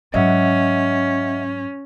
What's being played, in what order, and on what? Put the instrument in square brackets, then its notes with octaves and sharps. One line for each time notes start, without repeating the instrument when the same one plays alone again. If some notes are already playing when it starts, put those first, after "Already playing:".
[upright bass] G#2 F#3 [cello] C#4 [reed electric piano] D#5 E5 F#5